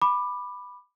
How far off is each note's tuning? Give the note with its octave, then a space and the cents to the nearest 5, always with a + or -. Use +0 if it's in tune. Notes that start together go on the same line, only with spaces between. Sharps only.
B5 +0 D6 +20